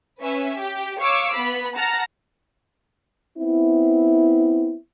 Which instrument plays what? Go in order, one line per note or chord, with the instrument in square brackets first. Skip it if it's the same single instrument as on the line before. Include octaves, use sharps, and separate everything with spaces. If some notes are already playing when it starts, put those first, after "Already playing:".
[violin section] C#4 B4 E5
G4
C#5 F5 C#6 D6 E6
B3 B5
F#5 A5 A#5 F6 A#6
[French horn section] B3 C4 E4